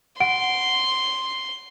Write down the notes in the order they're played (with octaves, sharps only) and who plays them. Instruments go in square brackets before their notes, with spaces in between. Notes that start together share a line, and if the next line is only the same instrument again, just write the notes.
[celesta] F#5 D7 [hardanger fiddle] C6